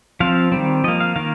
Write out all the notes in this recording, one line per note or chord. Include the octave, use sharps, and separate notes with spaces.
F3 C4 F5
D#3 G3 C4
F3 A#3 D#5
F5
D#3 A#3 F5